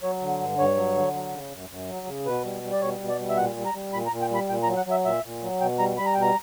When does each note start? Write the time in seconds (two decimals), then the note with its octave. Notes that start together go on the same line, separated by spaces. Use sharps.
0.02 F#3 C#5
0.21 D3
0.40 G2
0.58 G2 C#5
0.76 F#3
0.96 D3
1.14 F#3
1.32 C#3
1.51 F#2
1.69 F#2
1.88 F#3
2.07 C#3
2.25 B2 B4
2.44 G3
2.63 G3
2.72 D5
2.81 B2 C#5
3.00 B2
3.09 D5
3.19 G3
3.29 E5
3.37 A#2 F#5
3.56 G3
3.65 A#5
3.74 G3
3.92 A#2 B5
4.07 A#5
4.12 A#2
4.21 G5
4.30 G3 B5
4.49 A#2 G5
4.63 A#5
4.67 F#3
4.77 F#5
4.86 F#3 E5
5.05 A#2 E5
5.24 A#2
5.42 F#3
5.60 B2 G5
5.79 G3 A#5
5.98 G3 B5
6.06 A#5
6.14 B2 G5
6.22 A#5